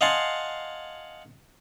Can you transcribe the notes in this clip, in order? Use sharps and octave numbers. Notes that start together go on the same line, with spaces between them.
D#5 F5 F#5 G#5 A5 C6